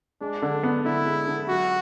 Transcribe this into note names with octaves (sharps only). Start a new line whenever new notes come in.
G#3 D4
D3
B3
D3 E4
G#3
D3
F#3 F#4